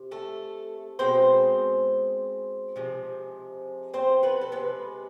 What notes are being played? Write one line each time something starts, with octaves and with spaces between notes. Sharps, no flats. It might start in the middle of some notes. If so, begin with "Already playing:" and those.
Already playing: C3
A3 A4
B2 G#3 C4 C5
C3 F3 G#3
C4 C5
B3 B4
A4
C3 G#3 B3 B4